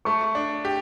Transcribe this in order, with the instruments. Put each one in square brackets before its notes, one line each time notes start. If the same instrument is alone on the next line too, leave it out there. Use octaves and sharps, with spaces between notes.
[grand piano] A3 [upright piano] C#6
[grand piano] D4
G4